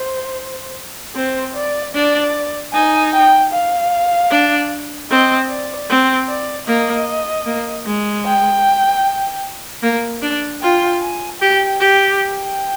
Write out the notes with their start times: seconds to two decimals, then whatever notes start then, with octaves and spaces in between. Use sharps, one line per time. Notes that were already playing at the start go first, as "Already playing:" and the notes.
Already playing: C5
1.15 C4 C5
1.55 D5
1.95 D4 D5
2.74 D#4 G#5
3.14 G5
3.53 F5
4.31 D4
5.10 C4 D#5
5.50 D5
5.90 C4
6.28 D5
6.67 A#3 D#5
7.46 A#3
7.86 G#3
8.26 G5
9.83 A#3
10.22 D4
10.62 F4 G5
11.02 G#5
11.41 G4 G5
11.80 G4
12.20 G5